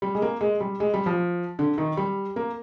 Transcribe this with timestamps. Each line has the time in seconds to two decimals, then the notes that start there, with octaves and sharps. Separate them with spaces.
0.02 G3
0.15 G#3
0.22 A#3
0.41 G#3
0.60 G3
0.80 G#3
0.94 G3
1.06 F3
1.59 D3
1.78 D#3
1.97 G3
2.36 A#3